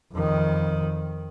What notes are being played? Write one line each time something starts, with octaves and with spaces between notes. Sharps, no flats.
F2 D#3